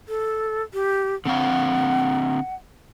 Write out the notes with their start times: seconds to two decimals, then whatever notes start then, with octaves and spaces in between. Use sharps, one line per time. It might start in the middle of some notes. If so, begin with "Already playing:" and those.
0.09 A4
0.74 G4
1.25 D3 C4 F5 F#5